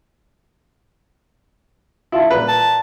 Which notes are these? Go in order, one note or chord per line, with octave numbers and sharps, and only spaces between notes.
E4 F4 A5
A#2 B4
A5